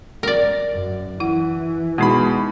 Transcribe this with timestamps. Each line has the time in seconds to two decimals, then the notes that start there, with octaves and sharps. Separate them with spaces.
0.23 A#4 D5
0.73 F#2
1.20 E3 E4 F#5
1.98 B2 G#3 B3 D#4 G#4 B5